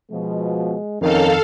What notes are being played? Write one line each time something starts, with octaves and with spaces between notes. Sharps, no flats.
B2 F3 G#3
F2 D#3 C#4 D#4 A4 A#4 F5